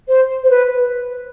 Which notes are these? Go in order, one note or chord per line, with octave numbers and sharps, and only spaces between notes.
C5
C5
B4